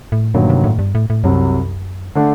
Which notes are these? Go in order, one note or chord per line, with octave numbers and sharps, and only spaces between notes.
A2
G1 G2 A#2 D#3 F#3 A#3
C3
A2
G2
A2
A2
C2 F#2 C3 F#3
D3 A3 D4